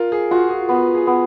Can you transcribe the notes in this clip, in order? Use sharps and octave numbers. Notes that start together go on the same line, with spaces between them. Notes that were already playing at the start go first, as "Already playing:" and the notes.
Already playing: F4 A#4
G#4
F4 F#4
G#4
B3 B4
G#4
B3